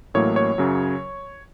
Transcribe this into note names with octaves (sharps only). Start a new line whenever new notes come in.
A1 A2 F#3 A#3 C#5
C#5
F#2 C#3 F#3